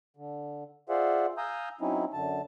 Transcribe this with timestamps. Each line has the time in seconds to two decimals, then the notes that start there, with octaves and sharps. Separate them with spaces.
0.17 D3
0.89 F4 G#4 C5 D5 E5 F#5
1.38 F5 G#5 A#5 D#6 E6 G6
1.81 F#3 C4 C#4 D#4 E4
2.13 F#2 D3 A5